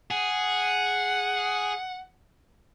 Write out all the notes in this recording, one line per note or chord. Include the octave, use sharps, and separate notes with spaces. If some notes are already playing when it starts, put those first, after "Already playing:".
G#4 F#5